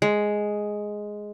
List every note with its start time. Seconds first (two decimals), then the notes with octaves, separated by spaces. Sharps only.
0.02 G#3